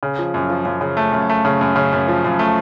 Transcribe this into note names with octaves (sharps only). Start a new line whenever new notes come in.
C#3
F3
F#2
F3
F#2
C#3
A3
F#2
A3
C#3
F#2
C#3
F#2
F3
F#2
A3